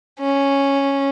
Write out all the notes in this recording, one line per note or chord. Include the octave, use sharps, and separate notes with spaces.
C#4